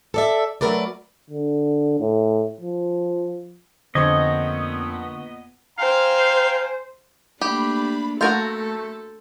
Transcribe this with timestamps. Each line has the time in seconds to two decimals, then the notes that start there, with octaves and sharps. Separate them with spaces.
0.14 A4 D5 E5
0.61 F#3 G3 A3 A#4 B4 D5
1.30 D3
2.00 A2
2.61 F3
3.95 F2 A#2 D3 B3 C5 D#5 C#6 G#6
5.79 C5 F5 G5 G#5 A#5
7.41 A3 A#3 D4 G4 B5
8.21 A3 F#4 A4 A#4 F5 C6 G6 A6